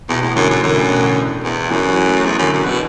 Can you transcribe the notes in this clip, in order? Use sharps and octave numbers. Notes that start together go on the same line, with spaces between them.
E2 B2
E2 A2
F#2 D3
F#2 E3
F#2 D3
A2
B2
D3
E2
F#2 E3
F#3
A3
E2 F#3
F#2 D3
F#2
B2 E3